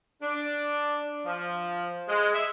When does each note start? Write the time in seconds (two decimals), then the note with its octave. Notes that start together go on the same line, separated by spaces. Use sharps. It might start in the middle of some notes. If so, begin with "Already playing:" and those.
0.22 D4
1.25 F3
2.09 G#3
2.35 E5